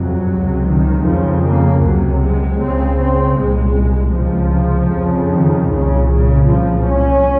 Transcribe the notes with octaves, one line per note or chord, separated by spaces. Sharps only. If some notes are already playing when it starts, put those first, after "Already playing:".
Already playing: F2 C3 F#3
C#2 C3
D#3
F2 C#3 F3
A#3
C#2 C3 F#3
G#3
C#2 C#3 C4
C4
C2 A#2 G#3
C#2 C3 F3
F2 C#3
D#3
C2 A#2 C#3
C#3
C2 A#2 F3
C#4